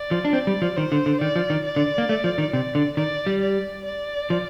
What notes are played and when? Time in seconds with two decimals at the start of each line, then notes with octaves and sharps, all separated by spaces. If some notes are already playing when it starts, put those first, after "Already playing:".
Already playing: D5
0.11 F3
0.25 D4
0.33 C4 D5
0.47 G3
0.62 F3
0.76 D#3 C5
0.92 D3
1.06 D3
1.21 D#3 D5
1.36 F3
1.50 D#3
1.65 D5
1.76 D3
1.98 A#3
2.09 A3
2.24 F3
2.38 D#3
2.53 C3 D5
2.75 D3
2.97 D#3 D5
3.27 G3
3.42 D5
3.85 D5
4.30 F3